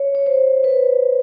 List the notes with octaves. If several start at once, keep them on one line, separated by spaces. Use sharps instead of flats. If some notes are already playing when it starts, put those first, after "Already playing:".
Already playing: C#5
C#5
C5
B4